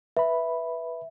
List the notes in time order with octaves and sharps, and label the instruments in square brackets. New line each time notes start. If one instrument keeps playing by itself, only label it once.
[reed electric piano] B4 B5 [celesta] E5